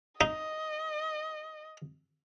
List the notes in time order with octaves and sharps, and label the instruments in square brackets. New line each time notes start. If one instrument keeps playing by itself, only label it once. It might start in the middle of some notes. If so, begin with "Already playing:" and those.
[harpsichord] D#4 [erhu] D#5